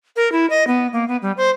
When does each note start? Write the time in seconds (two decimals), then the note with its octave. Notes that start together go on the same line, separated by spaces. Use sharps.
0.16 A#4
0.32 E4
0.50 D#5
0.67 B3
0.93 A#3
1.08 B3
1.22 G3
1.37 C5